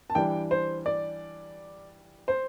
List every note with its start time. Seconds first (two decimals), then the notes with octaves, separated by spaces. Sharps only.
0.10 A5
0.15 E3 G3 D4 G5
0.51 C5
0.86 D5
2.28 C5